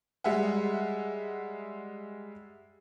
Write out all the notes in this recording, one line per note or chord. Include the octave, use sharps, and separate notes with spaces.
G3 G#3 E5 F#5